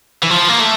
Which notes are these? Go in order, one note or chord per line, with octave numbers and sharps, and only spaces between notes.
E3
F3
A#3
A3